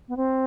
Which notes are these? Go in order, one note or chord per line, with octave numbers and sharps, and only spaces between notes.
B3
C4